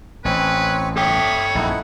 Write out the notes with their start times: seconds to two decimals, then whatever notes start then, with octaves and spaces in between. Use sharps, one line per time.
0.25 A1 C4 B4 C#5 G#5
0.97 A4 C#5 E5 G5 D6 D#6
1.55 A#1 F#2 D#4 E4 F#5